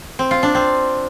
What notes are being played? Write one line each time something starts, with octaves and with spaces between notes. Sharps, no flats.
C4
F4
D4
C4